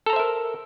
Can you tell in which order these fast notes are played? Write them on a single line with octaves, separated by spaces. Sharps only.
A4 A#5 C5 E5 A#4